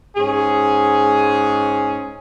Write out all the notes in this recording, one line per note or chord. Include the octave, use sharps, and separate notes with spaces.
G#2 C#4 G#4